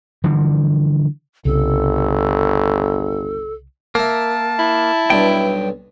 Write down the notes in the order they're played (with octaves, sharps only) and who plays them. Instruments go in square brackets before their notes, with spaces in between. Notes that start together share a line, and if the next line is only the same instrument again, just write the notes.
[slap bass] D3 E3 F3 G3
[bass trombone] G1 [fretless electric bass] C2 C#3 [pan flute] A4
[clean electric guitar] A#3 [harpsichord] A#4 E5 [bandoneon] A5
[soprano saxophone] E4
[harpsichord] B1 G2 [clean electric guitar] G5